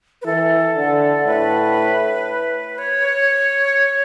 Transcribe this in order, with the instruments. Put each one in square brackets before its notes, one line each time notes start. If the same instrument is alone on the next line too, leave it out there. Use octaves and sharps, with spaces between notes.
[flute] B4
[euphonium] E3 [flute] A4
[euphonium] D3
[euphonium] A2 [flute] B4
[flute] C#5